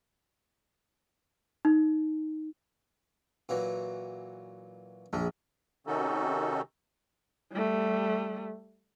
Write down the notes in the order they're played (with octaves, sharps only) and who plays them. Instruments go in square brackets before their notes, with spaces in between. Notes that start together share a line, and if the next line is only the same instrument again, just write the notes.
[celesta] D#4
[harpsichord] A#2 E3 F#3
[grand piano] A#1 [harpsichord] G#3
[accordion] C3 D#3 C#4 D#4 F#4 A4
[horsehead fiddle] G3 A3